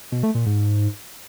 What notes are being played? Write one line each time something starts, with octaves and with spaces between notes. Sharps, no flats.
B2
A3
A#2
G#2